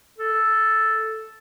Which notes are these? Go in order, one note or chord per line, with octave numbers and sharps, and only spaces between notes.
A4